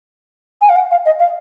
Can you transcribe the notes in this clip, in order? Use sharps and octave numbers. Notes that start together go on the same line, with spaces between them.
G#5
F5
F#5
F5
D#5
F5